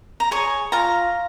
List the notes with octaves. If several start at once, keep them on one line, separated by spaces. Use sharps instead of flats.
A#5
G#4 C#5 G#5 C#6
F4 F5 A#5